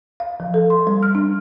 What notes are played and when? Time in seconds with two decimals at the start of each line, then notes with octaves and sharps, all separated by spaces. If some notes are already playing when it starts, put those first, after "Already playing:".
0.20 F5
0.40 F3
0.54 A4
0.70 C6
0.87 G3
1.03 F6
1.15 D4